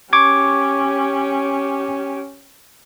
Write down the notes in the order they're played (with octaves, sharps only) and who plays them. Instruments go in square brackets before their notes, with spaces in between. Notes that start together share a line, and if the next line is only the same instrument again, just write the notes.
[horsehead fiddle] C#4 G4 [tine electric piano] C#6 D6 G#6